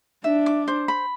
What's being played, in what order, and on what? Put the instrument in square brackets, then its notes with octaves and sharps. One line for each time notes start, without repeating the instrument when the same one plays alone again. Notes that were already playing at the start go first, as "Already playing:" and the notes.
[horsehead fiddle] D4 [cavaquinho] E5
[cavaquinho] D6
C5
B5